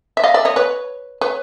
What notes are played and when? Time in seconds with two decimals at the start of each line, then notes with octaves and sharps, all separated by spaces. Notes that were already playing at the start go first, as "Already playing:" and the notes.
0.17 E5
0.24 D#5 F5
0.34 D5 E5
0.45 C#5 D#5
0.56 B4 C#5
1.21 B4 C#5